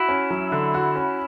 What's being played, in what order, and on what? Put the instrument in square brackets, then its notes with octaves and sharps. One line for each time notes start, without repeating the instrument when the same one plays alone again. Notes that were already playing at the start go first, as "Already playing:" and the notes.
Already playing: [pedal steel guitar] E4 [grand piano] F#4
[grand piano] C#4
F#3
D3
F#4
C#4